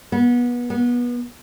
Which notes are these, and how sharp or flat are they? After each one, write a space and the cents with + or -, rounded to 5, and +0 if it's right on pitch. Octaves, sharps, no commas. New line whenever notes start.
B3 -25
B3 -25